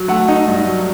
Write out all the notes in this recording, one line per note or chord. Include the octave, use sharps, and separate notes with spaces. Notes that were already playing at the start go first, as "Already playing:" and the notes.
Already playing: F#3
A3 F#5
D#4
G2
F#3